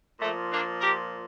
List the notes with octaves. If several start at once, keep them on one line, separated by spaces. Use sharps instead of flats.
A#2 F3 A3
A#3 D4
G4 A#4